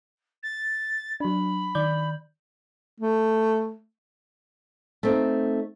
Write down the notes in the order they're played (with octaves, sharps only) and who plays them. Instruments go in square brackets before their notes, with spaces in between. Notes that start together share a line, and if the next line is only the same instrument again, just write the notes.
[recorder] A6
[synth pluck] F#3 D4 [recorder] B5
[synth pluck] D#3 D5 G6
[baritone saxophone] A3
[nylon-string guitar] A3 C4 D#4